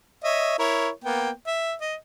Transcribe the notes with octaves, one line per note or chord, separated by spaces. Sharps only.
C#5 D#5 E5
E4 A#4 C#5
A#3 B3 G5
E5
D#5